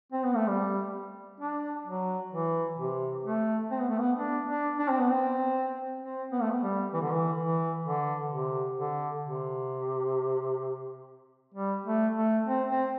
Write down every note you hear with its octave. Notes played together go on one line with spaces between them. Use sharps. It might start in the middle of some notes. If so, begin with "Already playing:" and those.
C4
B3
A3
G3
D4
F#3
E3
C3
A3
C4
B3
A3
B3
D4
D4
D4
C4
B3
C4
C4
B3
A3
B3
G3
E3
D3
E3
E3
D3
C3
D3
C3
G3
A3
A3
C4
C4